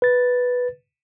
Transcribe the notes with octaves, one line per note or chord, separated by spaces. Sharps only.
B4 A6